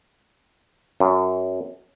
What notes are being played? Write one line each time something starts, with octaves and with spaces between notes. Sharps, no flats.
F#2